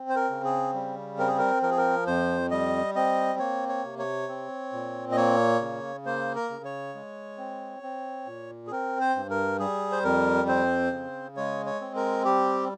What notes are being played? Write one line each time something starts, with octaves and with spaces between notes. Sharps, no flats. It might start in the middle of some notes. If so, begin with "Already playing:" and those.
Already playing: C4
C5
A#4
C#3
G#4
G3
C4 A#4
G#4
A#4
F3 A#4
G#4
A#4
F2 C5
G3 D#5
C4 D#5
A#3 C#5
C#5
C3
C#5
C4
A#2
D#5
A#3 C#5
C#3
A#3 C5
A#4
C#3
C#5
G#3
C4
C4
A#2
G#4
C4 A#4
C5
G2
A#4
G3 G#4
C5
F2 A#4
C4 C5
C#3
G#3 C#5
C#5
C4
A#4
G3 G4